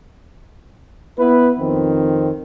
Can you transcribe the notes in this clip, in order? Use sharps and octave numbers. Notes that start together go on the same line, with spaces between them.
B3 E4 B4
F2 D#3 C4